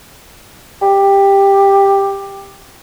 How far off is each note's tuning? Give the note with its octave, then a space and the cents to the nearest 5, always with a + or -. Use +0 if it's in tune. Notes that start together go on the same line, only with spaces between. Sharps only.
G4 +10